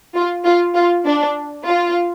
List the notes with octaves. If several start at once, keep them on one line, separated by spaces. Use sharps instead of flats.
F4
F4
F4
D4
F4